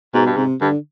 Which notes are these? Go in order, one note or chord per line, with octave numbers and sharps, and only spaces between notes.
G#2 B2
G2
G#2 C3
G2 D3